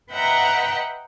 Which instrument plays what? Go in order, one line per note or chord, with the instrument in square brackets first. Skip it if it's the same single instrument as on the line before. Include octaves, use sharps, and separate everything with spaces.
[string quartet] B4 D#5 E5 F#5 G5 A#5